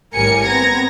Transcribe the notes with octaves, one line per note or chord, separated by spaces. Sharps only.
G#1 A2 G3 A#4 G#5 C#7
B3 C4 A#5 G#6 A#6